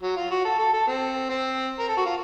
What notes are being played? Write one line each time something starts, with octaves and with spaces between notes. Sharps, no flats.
F#3
F4
F#4
A4
A4
A4
C4
C4
A#4
A4
F#4
F4